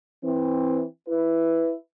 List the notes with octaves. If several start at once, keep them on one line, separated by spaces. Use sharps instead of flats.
E3 C4
E4 B4